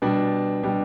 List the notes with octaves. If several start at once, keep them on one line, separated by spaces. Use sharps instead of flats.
B2 G3 D4
B2 G3 D4